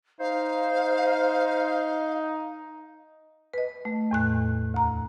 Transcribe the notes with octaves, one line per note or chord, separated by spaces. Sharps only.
D#4 C5 F5
B4 D#5
A3
E2 A2 F#6
D2 A#5